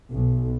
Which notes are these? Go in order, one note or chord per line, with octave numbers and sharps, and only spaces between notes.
B1